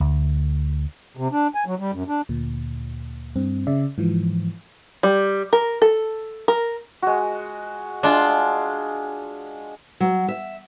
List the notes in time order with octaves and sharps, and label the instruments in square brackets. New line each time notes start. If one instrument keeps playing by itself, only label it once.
[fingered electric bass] D2
[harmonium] C3
D4
G#5
F#3
G3
F#2
D4
[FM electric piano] D2 A#2
G2 C4
C#3 D5 E5
G#2 E3 F3
[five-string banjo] G3
A#4
A4
A#4
[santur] G#3 F#4
[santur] G#3 [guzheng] D4 F4
[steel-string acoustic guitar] F#3
E5